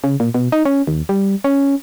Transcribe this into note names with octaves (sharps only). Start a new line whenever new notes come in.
C#3
A#2
B2
D#4
C#4
D#2
G3
C#4